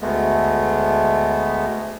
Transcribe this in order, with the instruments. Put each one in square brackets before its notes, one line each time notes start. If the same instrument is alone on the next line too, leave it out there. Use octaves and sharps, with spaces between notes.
[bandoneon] D2 G#3 A3 B3